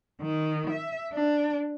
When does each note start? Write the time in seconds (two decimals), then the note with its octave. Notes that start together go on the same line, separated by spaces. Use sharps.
0.22 D#3
0.70 E5
1.13 D4